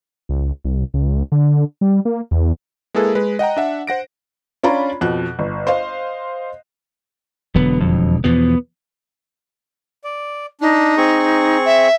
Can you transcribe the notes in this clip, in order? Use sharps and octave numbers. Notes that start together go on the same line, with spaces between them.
C#2
C2
C#2
D3
G3
A#3
E2
G#3 A#3 E4 G#4 A4 B4
G#3 B4
D#5 F#5 G5 A#5
D4 E5 F#5
C5 F#5 A#6 D7
C#4 D4 F4 D5 A#5 B5
F2 B2 F#6
G1
C5 D#5 F5
E1 D3 F#3 B3
F2
E2 B2 F3 B3
D5
D4 D#4
C4 G#4 C#6
E5